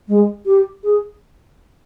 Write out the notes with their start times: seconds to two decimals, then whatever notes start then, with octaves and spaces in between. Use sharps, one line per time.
0.08 G#3
0.45 G4
0.83 G#4